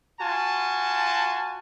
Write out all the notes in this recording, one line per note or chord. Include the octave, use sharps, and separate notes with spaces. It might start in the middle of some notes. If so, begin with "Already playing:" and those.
F4 F#4 G#5 A5